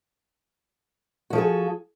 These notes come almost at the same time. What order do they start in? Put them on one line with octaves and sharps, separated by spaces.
F#4 F3 A4 G#4